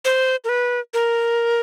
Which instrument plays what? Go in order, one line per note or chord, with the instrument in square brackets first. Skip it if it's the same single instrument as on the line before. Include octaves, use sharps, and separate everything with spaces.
[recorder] C5
A#4
B4
A#4